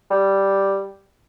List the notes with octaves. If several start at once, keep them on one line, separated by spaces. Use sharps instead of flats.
G3